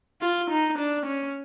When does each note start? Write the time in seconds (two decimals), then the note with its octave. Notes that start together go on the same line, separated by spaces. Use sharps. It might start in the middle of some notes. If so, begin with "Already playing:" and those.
0.21 F4
0.51 D#4
0.78 D4
1.06 C#4